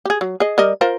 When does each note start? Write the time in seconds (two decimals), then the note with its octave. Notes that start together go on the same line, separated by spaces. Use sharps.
0.05 G4 G#4
0.21 F#3
0.40 G#4 D#5
0.58 G3 A#4 D#5
0.81 F4 A#4 C5